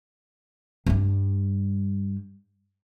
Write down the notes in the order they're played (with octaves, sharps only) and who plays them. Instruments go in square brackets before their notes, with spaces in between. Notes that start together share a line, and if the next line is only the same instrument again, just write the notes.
[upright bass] G2 G3